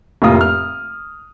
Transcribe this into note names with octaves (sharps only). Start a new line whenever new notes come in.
F1 A2 C3 A#3 F4 D#6
F6